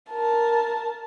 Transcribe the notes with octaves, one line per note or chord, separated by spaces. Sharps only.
A#4 A5